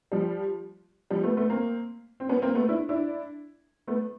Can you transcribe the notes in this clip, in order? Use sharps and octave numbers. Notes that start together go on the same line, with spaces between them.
F3 G3
F3 G3
A3 B3
A3 B3
A#3 C4
C4
B3 C#4
A#3 C4
A3 B3
D4 E4
D4 E4
A3 B3